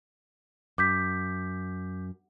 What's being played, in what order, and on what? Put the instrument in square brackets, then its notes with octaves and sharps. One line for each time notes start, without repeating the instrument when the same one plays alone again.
[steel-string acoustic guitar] F#2 [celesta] D6 G6 B6